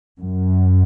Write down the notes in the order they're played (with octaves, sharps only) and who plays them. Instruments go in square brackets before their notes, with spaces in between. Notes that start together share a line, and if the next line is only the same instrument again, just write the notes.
[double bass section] F#2